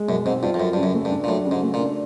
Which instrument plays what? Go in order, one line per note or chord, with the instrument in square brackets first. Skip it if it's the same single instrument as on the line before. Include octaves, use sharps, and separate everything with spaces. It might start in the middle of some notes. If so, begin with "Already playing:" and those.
Already playing: [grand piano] G#3
[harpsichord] F#2 [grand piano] B2
[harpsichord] G#2 [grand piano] C4
[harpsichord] G2 [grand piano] F4
[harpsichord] F2
[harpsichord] F#2 [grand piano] F#3
[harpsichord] G2 [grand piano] C#3
[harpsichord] F#2
[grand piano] A3
[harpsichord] G2
[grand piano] D4
[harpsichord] A#2
[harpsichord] A2 [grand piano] F#3
[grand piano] C#3
[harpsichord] G#2
[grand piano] A3
[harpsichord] A#2
[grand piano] D4